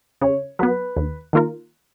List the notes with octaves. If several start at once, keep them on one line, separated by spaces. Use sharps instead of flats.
C#3 C#5
F#3 B3 B4
D#2
D#3 A#3 F4 A#4